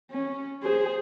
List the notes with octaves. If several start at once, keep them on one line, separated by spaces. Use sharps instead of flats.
C#4
G#4 C5